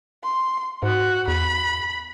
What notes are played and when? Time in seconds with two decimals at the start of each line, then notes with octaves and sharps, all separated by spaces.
0.24 C6
0.83 G#2 F#4 F#6
1.28 E2 B5